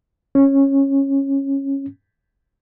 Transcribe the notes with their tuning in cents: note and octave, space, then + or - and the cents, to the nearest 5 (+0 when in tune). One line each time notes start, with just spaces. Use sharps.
C#4 -15